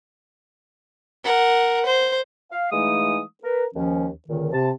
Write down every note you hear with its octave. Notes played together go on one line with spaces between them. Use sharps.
A#4 F#5
C5
F5
E3 G#3 A3 D#4 F5 D#6
A#4 B4
D#2 F3 C#4
C#2 A#2 D3 D#3
C3 A5